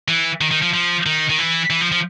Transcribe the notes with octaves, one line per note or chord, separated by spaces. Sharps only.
E3
D#3
D#3
F3
F3
D#3
D#3
E3
E3
F3
F3